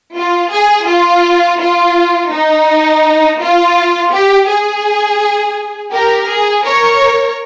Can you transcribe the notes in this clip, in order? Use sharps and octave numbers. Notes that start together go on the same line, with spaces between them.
F4
G#4
F4
F4
D#4
F4
G4
G#4
G4 A#4
G#4
A#4 C#5